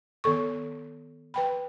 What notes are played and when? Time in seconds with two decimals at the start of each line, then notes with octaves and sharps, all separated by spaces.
0.24 D#3 B3 A4 C#6
1.34 B4 G5 B5